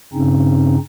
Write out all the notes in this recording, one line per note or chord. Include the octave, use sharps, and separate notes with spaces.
G2 C#3 C4 C#4 D#4